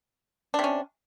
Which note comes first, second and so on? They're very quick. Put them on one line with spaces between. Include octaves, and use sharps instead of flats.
D4 C3 C#4